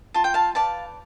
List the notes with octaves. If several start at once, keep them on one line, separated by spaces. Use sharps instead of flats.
F4 A5
G5
F5 A5
B4 D5 F5 A5